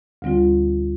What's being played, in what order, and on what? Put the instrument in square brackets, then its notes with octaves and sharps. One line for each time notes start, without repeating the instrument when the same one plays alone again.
[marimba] D2 D3 G3 C4 F4